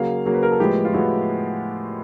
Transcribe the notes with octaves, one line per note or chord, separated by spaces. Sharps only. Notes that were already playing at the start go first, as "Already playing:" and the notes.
Already playing: C#3 F#3 A#3 F5
C#3 F#3 A#3
B4
A#4
A4
A2 F3 G#3 B3 G4
F4
A2 F3 G#3 B3 F#4